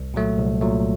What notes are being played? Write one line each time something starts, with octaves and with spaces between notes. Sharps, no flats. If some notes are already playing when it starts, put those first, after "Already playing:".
Already playing: C2
A#2 F#3 A3
C2
A#2 F#3 A3